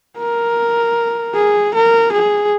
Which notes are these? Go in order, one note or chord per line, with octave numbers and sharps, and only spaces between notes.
A#4
G#4
A#4
G#4